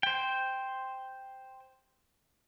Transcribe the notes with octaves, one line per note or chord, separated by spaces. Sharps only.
C5 G5